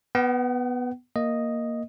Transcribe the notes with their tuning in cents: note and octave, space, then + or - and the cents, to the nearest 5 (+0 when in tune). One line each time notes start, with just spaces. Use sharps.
B3 +0 F#5 +45
A#3 +0 D#5 +0